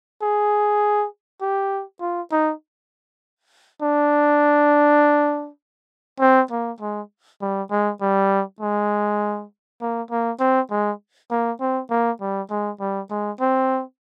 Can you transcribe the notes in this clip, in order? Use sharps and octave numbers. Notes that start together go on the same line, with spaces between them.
G#4
G4
F4
D#4
D4
C4
A#3
G#3
G3
G#3
G3
G#3
A#3
A#3
C4
G#3
A#3
C4
A#3
G3
G#3
G3
G#3
C4